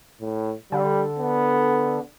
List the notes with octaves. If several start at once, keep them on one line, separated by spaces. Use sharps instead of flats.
A2
D3 G3
B3